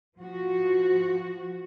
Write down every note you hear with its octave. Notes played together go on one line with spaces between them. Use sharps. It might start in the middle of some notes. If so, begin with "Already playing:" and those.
F3 F#4